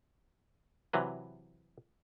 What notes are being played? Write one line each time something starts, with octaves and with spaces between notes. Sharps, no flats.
C3 E3 F#3 B4